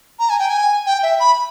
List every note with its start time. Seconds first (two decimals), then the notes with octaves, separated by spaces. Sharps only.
0.19 A#5
0.30 G#5
0.39 G5
0.50 G#5
0.86 G5
1.03 E5
1.20 B5